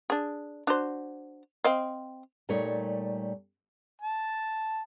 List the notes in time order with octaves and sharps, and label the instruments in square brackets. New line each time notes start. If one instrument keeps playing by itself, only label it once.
[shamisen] D4 G#4
D4 F#4 C5
C4 D#5 F5
[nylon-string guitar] A#2 G3 A3 D#4 C#5
[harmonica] A5